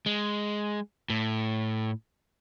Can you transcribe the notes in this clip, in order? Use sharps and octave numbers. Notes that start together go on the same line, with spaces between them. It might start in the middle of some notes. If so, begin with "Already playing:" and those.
G#3
A2